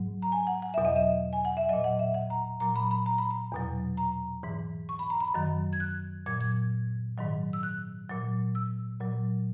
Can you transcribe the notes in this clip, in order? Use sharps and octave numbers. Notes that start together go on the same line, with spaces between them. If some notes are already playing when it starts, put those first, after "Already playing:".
Already playing: G#2 F#3
A#5
G#5
F#5
F#5
E2 B2 F#3 E5
D#5
E5
G#5
F#5
E5
A#2 F#3 D#5
F#5
E5
F#5
A#5
A#2 F#3 A#5
B5
B5
A#5
B5
A#5
E2 B2 F#3
A#5
G#2 E3
C#6
B5
A#5
B5
F#2 D#3 F#3
G#6
F#6
A#2 F#3 G#6
G#6
G#2 D#3 F#3
E6
F#6
A#2 F#3
E6
A#2 F#3